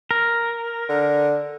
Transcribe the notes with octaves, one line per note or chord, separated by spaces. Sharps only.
A#4
D3